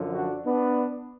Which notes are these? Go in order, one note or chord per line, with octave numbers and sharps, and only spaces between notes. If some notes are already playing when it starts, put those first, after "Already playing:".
Already playing: F#2 D3 F3
D4 F#4
B3 D4